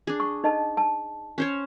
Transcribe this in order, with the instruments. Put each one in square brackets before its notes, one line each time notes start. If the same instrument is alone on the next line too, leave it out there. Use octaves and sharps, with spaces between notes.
[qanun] D4 G#4
[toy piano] C#6
D#4 D#5 A5
A5
[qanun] C#4 C5 C#5